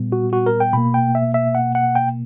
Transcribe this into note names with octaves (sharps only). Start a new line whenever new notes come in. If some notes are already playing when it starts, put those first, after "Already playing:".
Already playing: A#2 G3 B3
F#4
F#4
A#4
G5
B2 A#3 B5
G5
E5
E5
F#5
F#5
G5